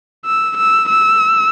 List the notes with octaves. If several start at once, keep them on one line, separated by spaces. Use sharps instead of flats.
E6
E6
E6